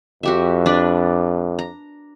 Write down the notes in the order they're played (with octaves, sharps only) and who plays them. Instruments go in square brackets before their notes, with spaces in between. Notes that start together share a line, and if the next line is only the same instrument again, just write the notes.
[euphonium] F2 [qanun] F#4 G4 E5
[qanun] D4 B4 D5
A#5